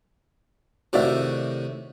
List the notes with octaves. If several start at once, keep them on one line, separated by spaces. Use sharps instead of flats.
A2 C3 D#3 F#4 D5 E5